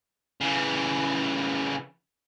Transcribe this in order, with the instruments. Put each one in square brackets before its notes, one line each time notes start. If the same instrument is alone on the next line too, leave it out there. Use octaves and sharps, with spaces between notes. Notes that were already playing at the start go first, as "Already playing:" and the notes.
[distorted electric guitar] C#3 E3